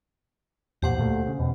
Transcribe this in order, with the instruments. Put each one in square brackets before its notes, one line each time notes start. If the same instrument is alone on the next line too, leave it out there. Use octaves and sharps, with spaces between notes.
[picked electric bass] E2 A#2 [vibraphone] G4 C5 F#5
[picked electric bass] D2 A#2 A3
C#3
E2 B2